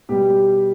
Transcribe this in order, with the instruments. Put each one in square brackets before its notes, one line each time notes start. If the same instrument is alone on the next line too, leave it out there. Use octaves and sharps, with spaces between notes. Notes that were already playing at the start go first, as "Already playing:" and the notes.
[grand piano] B2 G3 G4